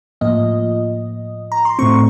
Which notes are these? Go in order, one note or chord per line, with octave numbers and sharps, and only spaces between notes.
A2 F3 A#3 D#5
A#5
C6
A2 A3 C4 C#6